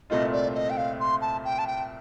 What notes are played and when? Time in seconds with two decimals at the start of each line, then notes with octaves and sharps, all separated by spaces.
0.10 C2 A#2 A3 C4 F4 D#5
0.32 D5
0.55 D#5
0.70 G5
0.77 F5
1.00 C6
1.21 A5
1.45 G5
1.59 A5
1.67 G5